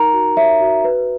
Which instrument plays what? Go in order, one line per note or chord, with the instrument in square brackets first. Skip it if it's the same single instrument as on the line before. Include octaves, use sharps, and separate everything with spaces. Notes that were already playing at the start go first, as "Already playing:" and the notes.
Already playing: [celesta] D#4 A#4 A#5
F#4
C#5 E5
F#4
B4